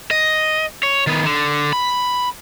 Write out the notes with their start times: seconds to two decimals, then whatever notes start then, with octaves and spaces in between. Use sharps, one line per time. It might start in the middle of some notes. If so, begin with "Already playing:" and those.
0.11 D#5
0.83 C#5
1.07 D#3 B3
1.26 D3
1.73 B5